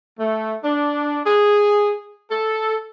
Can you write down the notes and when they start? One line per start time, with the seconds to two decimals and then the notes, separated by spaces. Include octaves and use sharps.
0.19 A3
0.64 D4
1.25 G#4
2.30 A4